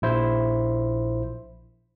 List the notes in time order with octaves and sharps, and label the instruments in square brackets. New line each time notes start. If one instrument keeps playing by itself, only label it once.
[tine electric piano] A#1 E4 C5